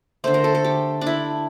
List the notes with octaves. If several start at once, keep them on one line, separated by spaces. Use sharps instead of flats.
D3 A3 C5
A#4
A4
A4
G4
D4
E4